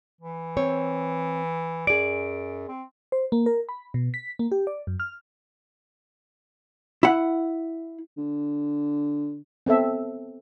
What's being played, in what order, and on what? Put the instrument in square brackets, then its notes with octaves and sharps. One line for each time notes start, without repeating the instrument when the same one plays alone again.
[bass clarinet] E3
[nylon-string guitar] C4 C#5
[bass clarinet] F#2 [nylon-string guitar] G#4 D5 [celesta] D7
[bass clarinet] C4
[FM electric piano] C5
A#3
A#4
B5
B2
B6
A#3
G4
D5
F#2
F6
[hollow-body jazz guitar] E4 F#5
[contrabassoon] D3
[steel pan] B3 C4 A4 E5